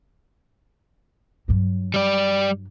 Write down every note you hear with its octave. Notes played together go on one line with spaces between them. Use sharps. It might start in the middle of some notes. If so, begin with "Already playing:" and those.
G2 F#3
G3 D5